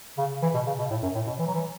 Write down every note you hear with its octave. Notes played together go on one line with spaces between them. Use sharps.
C#3
E3
B2
C#3
B2
A2
F#2
A2
B2
E3
F#3
E3